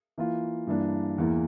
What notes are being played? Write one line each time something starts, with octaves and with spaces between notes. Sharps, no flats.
E3 A#3 F4
G2 E3 A#3 D4
E2 E3 A#3